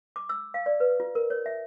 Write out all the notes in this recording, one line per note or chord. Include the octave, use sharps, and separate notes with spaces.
D6
E6
F5
D5
B4
F4
A#4
C#5
E5